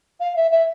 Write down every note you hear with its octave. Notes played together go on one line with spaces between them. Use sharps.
F5
E5
E5